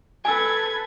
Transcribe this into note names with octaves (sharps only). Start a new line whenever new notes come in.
A4 B4 G#5 E6 G#6